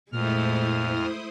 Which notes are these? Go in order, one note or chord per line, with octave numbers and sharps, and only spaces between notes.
F2 A#2 G#3 A3 E4 C5 D#6 F6